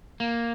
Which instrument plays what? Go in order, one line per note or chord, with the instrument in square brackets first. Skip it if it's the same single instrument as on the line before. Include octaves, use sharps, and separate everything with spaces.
[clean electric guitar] A#3